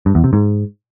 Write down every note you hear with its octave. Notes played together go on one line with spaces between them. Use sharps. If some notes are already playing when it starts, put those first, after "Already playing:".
G2
E2
C3
G#2